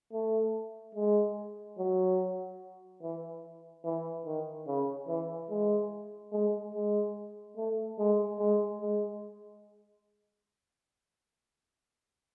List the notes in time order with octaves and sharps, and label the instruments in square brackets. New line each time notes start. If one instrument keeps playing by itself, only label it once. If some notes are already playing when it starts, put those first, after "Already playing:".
[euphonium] A3
G#3
F#3
E3
E3
D#3
C#3
E3
G#3
G#3
G#3
A3
G#3
G#3
G#3